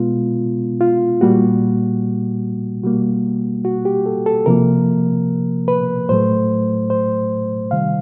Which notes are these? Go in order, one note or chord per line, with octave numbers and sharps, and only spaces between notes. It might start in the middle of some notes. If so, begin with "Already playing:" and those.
Already playing: B2 G#3 B3 F4
F4
A#2 G3 A#3 F#4
B2 G3 A#3 F#4
F#4
G4
A4
A4
C3 F3 A#3 A#4
B4
A2 F#3 A3 C5
C5
C3 D#3 G3 F5